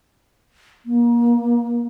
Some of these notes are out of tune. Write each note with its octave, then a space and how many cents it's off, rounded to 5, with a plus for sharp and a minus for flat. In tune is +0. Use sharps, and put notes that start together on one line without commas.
A#3 +25